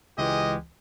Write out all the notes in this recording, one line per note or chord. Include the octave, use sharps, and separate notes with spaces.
C#2 E3 G#3 G4 D#5